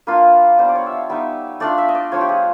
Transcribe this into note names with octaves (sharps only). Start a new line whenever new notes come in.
A#3 D4 F4 B4
G3 B3 D4 F4 C5
D5
C#5
E5
F5
G3 B3 D#4 E5
A3 D4 F4 D5
E5
D#5
D5
F3 A3 D4 F4 C#5
G4
G#4